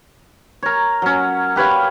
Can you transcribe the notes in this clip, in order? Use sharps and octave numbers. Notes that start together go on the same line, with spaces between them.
A#4 C#5
F#3 C#4
G4 B4 C#5 F5